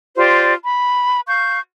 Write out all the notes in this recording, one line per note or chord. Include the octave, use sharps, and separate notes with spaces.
F4 G4 C5 D5
B5
F5 C#6 G6